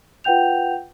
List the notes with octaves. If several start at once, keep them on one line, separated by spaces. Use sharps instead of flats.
F4 B4 F#5 G5 G6 F7